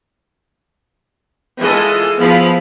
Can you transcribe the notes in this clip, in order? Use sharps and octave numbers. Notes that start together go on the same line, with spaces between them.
E3 G#3 F4 A4 D#5
F3 B3 E4 G#4 F5 B5